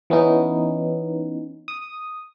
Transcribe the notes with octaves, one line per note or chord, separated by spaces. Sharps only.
E3 B3 C#4 D#4
D#6